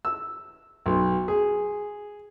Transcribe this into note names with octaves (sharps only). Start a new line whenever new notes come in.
E6
B1
G#4